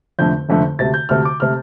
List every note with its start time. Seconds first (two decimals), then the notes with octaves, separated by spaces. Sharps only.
0.19 F1 F2 D3 A3 G6
0.49 F1 F2 D3 A3
0.79 D2 C3 A3 A6
0.94 G6
1.09 D2 C3 A3 F6
1.25 D6
1.40 C3 A3 F6